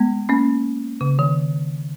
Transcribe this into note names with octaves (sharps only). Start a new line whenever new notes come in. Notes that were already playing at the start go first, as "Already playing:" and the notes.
Already playing: G#3 B3
A#3 C#4
C#3
D#3